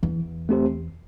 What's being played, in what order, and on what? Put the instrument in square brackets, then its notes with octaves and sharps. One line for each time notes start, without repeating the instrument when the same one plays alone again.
[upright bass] E2 [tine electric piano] E3
[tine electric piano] A3 C4 G4 C5